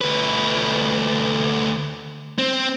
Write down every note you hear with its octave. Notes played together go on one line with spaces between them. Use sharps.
D2 B4
C4